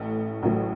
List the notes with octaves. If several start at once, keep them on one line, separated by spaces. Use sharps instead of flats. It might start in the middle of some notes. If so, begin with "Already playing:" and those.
Already playing: A1 A2 A3
A1 A2 F#3 A3